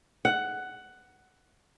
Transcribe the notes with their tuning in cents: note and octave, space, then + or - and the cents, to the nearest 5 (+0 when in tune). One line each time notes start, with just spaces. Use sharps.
F#5 +10